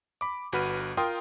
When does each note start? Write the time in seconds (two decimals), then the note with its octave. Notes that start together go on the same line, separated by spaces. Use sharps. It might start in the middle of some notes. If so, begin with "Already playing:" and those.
0.21 B5 D6
0.52 G1 F#4 B4 B5 F6 D#7
0.97 F4 A#4 G5 C6 D#6